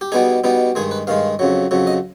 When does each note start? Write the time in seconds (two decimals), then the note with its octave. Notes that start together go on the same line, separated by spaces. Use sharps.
0.01 G4
0.12 B2 G3 B3 D#4 G#4
0.44 B2 G3 B3 D#4
0.75 G2 D#3 G#3 G#4
0.91 B4
1.07 G2 D#3 G#3 F5
1.39 F2 C#3 F#3
1.71 F2 C#3 F#3
1.87 D#5